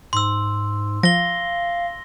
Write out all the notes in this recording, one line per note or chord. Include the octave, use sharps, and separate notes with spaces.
G#2 C6 E6
F3 F5 A#6 G7